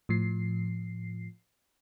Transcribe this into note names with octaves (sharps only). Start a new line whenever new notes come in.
A2 F3 C7